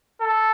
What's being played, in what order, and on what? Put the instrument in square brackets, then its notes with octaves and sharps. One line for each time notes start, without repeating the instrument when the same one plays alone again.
[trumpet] A4